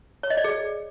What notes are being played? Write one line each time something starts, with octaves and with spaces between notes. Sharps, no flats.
C#5
D#5
D5
G#4